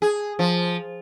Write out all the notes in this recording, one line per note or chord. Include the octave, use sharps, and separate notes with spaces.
G#4
F3